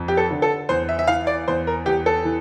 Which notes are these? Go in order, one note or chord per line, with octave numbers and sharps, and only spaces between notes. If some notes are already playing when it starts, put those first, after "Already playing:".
Already playing: F2
G4
A4
D3
A4
E2 C5
E5
E5
E3 F5
D5
E2 C5
A#4
E2 G4
A4
E3